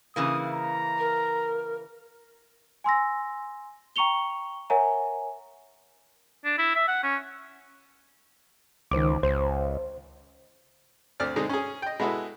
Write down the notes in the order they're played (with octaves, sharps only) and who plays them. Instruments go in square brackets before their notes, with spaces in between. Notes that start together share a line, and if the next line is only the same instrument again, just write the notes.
[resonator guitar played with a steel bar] C#3 E3 A#3 [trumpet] D#6
[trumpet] A#5
[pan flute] A#4
[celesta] G#5 C6 E6 A#6
G5 A#5 C#6 C#7 F7 G7
A#4 C#5 E5 F#5 G#5 A#5
[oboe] D4
E4
E5
F#5
C#4
[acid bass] C#2 [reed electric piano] D#3 C5 D6
[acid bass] C#2 [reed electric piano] C5
[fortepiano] D2 C4 D5 F6
D3 G#3 C4 D#4
C#4 G#4
D#5 G5
G#3 B3 E4 F#4 A4